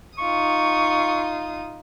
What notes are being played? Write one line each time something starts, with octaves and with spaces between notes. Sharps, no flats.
D#4 F4 C#6 D#6